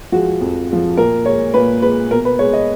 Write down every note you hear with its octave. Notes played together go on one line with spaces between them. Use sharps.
F3 G#3 F#4
F2
F3 G#3
A#2 A#4
G#3 C#5
A#2 B4
G#3 B4
B2 A#4
B4
G#3 C#5
D#5